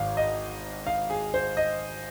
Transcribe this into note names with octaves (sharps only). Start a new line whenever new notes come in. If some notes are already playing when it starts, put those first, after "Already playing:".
Already playing: G#1 G#2 F5
D#5
F5
G#4
C5
D#5